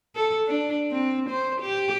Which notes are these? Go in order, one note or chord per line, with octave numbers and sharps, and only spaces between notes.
A4
D4
C4
C5
G4